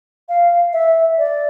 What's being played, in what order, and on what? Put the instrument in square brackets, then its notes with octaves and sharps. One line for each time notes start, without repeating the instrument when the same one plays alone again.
[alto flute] F5
E5
D5